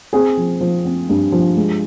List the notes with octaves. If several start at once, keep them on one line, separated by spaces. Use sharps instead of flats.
C4 G#4
F3
F3
C4
G2
F3
G#3